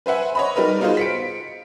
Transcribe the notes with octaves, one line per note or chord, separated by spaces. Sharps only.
B4 C5 E5 F#5 G#5
C#5 D#5 B5
G3 D#4 A#4 B4
B3 D#4 F4 F#4 G#4 C5
B6 C#7 D7